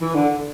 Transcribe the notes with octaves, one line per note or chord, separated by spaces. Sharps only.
E3
D3